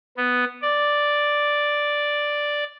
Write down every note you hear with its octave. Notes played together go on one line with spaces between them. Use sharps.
B3
D5